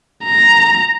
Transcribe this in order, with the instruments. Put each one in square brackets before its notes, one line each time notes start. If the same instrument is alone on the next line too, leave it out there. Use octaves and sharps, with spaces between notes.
[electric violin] A#5